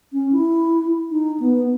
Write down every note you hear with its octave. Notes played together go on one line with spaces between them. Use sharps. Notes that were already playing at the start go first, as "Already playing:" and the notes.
C#4
E4
D#4
B3